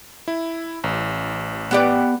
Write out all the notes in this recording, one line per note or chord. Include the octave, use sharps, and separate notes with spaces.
E4
A1
B3 G4 D5